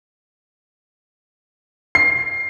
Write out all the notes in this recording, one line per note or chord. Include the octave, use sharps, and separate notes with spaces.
C7